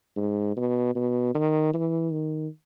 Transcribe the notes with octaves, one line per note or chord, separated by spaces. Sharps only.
G#2
B2
B2
D#3
E3
D#3